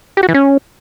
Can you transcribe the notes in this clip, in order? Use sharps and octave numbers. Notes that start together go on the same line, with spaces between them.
G4
F#4
E3
C#4